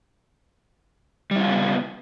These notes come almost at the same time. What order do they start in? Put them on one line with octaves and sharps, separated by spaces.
G3 E4 F4 C#3 B3